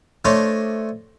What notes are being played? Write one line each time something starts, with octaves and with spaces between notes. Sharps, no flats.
A3 D4 C5 C#5 D#5